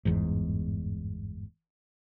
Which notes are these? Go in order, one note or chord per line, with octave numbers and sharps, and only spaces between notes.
G1 E2 G#2